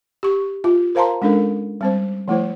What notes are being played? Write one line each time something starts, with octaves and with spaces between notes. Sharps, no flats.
G4 C#6
F4
A#4 C5 F5 A5 A#5 C6
G#3 C#4 D4 A4 A#4
G3 C4 C5
F3 A3 E4 C5